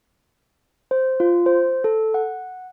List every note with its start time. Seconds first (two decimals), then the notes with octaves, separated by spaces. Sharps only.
0.91 C5
1.20 F4
1.46 C5
1.84 A4
2.14 F#5